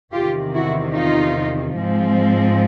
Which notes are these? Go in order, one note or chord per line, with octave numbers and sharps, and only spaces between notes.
E2 C3 D#3 F4 G4
E4 F#4
D#4 F4
G#2 F3 G#3 C4